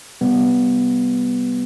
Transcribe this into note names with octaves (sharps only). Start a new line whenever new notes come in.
C3 G3 B3